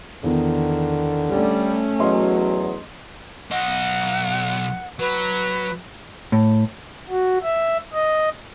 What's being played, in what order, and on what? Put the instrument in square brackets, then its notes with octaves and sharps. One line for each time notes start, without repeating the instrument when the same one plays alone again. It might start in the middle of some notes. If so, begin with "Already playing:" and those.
[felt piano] E2 [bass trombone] D3 [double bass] D#3
[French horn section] G3 [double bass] A3 C#4
[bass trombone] E2 [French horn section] F#3 [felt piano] D#5 C6
[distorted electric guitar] B1 D#5 [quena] F#5
[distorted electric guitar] F#3 [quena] B4
[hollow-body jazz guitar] A2
[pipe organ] F#4
E5
D#5